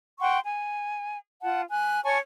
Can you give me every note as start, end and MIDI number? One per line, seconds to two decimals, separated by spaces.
0.20 0.37 78
0.20 0.37 79
0.20 0.37 84
0.20 0.37 85
0.44 1.16 80
1.42 1.61 65
1.42 1.61 78
1.42 1.61 81
1.69 2.03 80
1.69 2.03 90
2.03 2.17 73
2.03 2.17 80
2.03 2.17 81
2.03 2.17 85